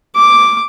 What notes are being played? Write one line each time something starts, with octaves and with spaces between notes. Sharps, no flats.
D6